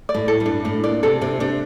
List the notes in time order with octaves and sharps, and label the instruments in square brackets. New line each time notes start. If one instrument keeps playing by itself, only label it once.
[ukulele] D5
[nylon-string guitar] A2
[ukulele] A4
[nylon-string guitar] G2
[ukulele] D4
[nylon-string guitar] A2 [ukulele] D4
[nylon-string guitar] A#2 [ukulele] D5
[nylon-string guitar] C3 [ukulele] A4
[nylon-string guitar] C3 [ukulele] D4
[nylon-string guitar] C3 [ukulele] D4